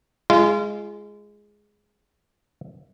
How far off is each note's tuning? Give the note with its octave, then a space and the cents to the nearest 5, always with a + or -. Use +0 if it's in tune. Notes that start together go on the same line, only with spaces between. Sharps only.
G#3 +0 F4 -30